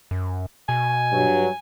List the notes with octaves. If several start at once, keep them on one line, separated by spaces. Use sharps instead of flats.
F#2
B2 G#5
G2 F#3